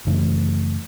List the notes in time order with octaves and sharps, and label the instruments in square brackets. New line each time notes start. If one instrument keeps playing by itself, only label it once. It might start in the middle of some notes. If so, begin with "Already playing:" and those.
[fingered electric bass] F#2 C#3 E3 A3